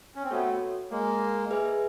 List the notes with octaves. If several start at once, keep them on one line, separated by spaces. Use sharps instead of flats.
C#4
C4
A3 B3 F#4 A4 C#5
G#3 A#3
G#4 B4 E5 G#5